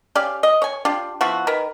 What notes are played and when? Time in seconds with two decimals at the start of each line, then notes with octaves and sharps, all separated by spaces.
0.15 C#4 G4 D5 F5
0.43 D#5
0.62 C#5 G#5
0.85 D4 F4 G4
1.21 F3 B3 E4 F#4
1.47 D#3 A#4 B4